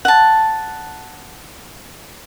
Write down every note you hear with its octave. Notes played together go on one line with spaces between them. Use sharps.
F#5 A5